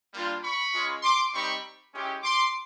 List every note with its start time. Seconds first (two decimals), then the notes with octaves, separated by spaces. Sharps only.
0.13 G3 A#3 D4 F4
0.42 B5 C#6
0.73 G#3 C#4 F4
1.02 C6 D6
1.33 G3 C4 D#4 G4 B5 C#6
1.92 G#3 C#4 E4 G4
2.23 C6 D6